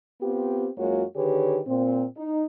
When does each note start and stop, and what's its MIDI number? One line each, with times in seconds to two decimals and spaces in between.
0.22 0.69 59
0.22 0.69 60
0.22 0.69 65
0.22 0.69 67
0.77 1.04 42
0.77 1.04 56
0.77 1.04 58
0.77 1.04 65
0.77 1.04 66
0.77 1.04 73
1.16 1.60 50
1.16 1.60 51
1.16 1.60 67
1.16 1.60 68
1.16 1.60 71
1.16 1.60 73
1.67 2.05 46
1.67 2.05 60
2.17 2.45 63